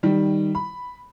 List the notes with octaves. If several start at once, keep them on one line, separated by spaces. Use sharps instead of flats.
D#3 G3
B5